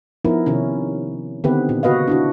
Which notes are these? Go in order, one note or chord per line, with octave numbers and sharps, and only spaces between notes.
F3 B3 D#4 E4 A#4
C3 D#3 C#4
D3 D#3 B3 C4 G4 B4
A#2
C#3 F#4 B4 D#5 F5
D4 E4 F#4